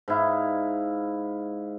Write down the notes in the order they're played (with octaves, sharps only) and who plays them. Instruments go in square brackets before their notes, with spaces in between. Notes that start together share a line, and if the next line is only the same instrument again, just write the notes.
[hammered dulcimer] G#2 E4 F5